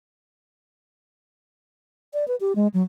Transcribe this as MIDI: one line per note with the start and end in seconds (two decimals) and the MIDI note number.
2.14 2.27 74
2.28 2.36 71
2.40 2.55 67
2.56 2.68 56
2.74 2.83 54